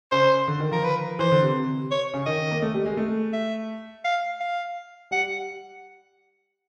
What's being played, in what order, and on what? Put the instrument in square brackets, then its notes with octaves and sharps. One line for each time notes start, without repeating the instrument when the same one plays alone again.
[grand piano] C#3 [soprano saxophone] C5
[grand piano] D3
D#3
[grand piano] F3 [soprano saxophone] A#4
[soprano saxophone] B4
[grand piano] E3 [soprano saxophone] C5
[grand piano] D3
C3
[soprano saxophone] C#5
[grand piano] C#3
[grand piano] D#3 [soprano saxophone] D#5
[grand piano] A#3
A3
G3
G#3
A3
[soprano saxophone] E5
F5
F5
[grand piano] G3 [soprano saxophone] F#5